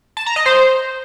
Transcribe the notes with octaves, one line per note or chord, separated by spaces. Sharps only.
A5
A#5
D#5
C5